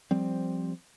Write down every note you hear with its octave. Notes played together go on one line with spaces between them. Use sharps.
F3 G3 C4